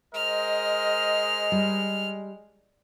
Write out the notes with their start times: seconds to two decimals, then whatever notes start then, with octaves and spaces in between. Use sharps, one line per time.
0.15 G#3 A#4 C5 D#5 F6
1.52 G3